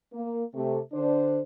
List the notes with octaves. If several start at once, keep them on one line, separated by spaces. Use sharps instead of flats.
A#3
C3 A3
D3 D4 C5